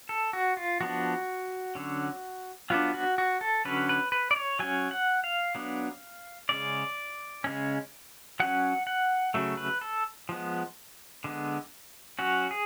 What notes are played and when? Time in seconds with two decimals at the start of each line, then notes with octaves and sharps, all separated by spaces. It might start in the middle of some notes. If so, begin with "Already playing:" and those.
0.09 A4
0.33 F#4
0.57 F4
0.80 F3 B3 D4 F#4
1.75 D3 F#3 C#4
2.70 F#3 B3 D4 F4
2.94 F#4
3.18 F#4
3.41 A4
3.65 D3 F#3 C#4 B4
3.89 B4
4.12 B4
4.31 D5
4.36 C#5
4.59 F#3 C#4 G#5
4.91 F#5
5.24 F5
5.55 F#3 B3 D4
6.49 C#3 G#3 C#4 D5
7.44 C#3 G#3 C#4
8.40 F#3 C#4 F#5
8.87 F#5
9.34 C#3 F#3 A3
9.57 B4
9.81 A4
10.29 F3 G#3 B3
11.24 D3 G#3 B3
12.19 F#3 C#4 F#4
12.51 G#4